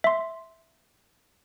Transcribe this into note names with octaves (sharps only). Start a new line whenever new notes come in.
E5 C6